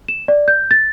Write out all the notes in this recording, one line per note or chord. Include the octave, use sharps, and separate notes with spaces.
E7
D5
G6
A6